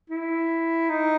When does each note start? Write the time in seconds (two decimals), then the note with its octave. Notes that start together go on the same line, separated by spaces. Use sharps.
0.10 E4
0.89 D#4